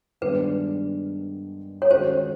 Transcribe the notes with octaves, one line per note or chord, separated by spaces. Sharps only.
G2 D#3 G#3 B3 D4 B4
C#5
D#3 G#3 C#4 F#4 A4 C5